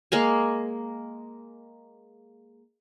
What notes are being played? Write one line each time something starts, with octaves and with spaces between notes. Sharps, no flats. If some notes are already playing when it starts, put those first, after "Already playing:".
G#3 A#3 F5 G#5